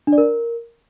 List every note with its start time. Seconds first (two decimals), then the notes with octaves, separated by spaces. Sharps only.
0.07 D4
0.13 D5
0.18 A#4